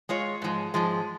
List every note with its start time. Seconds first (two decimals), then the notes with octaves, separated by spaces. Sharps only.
0.09 G#3 F4 C#5
0.42 G#2 F3 G#3
0.74 G#2 F3 G#3